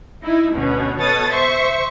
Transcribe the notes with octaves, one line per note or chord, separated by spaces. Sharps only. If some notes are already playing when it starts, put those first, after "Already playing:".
D#4 E4
D2 B2 C#4
B2 A4 C#5 D#6 A6
C5 E5 C#6